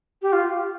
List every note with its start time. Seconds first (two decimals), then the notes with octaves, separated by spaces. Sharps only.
0.22 G4
0.32 F4